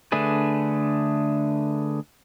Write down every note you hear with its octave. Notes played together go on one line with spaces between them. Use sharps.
D3 A3 D4 G#4 B4